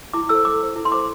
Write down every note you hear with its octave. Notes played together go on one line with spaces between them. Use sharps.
E4 D6
A4 C5 E6
E4 D6
A4 C5
E4
C6
A4 C5 D6